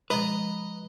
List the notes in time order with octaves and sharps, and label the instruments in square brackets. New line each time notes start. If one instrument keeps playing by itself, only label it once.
[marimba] F3 G#3 [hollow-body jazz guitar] B4 [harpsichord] D#5 A#5